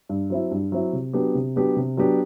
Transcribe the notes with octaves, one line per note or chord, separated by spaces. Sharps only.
G2
F#3 C4 E4
G2
F#3 C4 E4
C3
F#3 B3 D4 G4
C3
F#3 B3 D4 G4
C3
F#3 B3 D4 G4